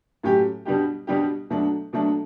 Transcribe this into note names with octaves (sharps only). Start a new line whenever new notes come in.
A2 F#3 C#4 G4
B2 G3 D4 G4
B2 G3 D4 G4
B2 F#3 A3 D4
B2 F#3 A3 D4